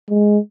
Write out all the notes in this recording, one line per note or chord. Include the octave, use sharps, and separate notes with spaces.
G#3